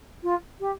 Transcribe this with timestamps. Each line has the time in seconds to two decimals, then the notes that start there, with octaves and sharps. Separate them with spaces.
0.23 F4
0.60 G4